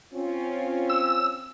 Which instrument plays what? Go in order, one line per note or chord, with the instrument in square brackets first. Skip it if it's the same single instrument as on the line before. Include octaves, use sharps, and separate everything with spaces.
[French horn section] C4 C#4 F4
[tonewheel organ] E6